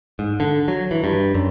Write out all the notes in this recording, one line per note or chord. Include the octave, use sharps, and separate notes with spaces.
G#2
D3
F#3
E3
G2
F#2